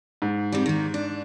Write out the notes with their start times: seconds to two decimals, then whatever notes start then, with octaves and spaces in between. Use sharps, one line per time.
0.22 G#2
0.52 C3 G3
0.66 D#3 A#3
0.94 D4